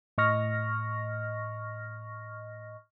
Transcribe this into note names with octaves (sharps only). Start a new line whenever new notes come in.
A2 D#5 C#6 F6 A#6